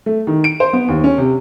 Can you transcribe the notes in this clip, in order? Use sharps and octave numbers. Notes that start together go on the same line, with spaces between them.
A3
D#3
D7
C5
B3
D#2
C#4
C3